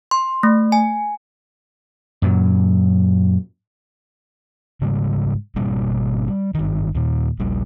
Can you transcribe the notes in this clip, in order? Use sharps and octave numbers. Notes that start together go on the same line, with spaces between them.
C6
A3
G#5
F#2 A#2 F#3
G#2 C#3 G3 G#3
G#1 B2 G3 A#3
G3
G1 D#3
D#2 A#2
D#1 A#1 G3